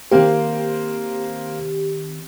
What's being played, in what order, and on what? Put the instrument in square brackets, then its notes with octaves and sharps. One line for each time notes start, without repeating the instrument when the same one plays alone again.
[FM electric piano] D#3 C4 G4 [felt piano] A#3 C5